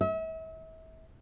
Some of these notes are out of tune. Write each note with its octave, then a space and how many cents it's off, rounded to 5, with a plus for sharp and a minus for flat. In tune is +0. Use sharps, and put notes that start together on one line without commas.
E5 -40